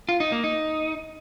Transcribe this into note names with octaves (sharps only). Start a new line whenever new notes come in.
F4
D#4
A#3
D#4